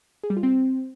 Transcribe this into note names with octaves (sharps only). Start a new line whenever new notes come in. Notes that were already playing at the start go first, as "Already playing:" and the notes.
G#4
G3
F4
C4